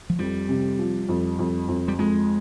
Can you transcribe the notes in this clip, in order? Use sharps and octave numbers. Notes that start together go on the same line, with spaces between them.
F3
F2 G3
C3
F3
F2
F2
F2
G3
F2 G#3